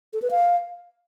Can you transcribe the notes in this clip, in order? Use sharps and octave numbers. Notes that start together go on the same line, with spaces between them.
A4
B4
F5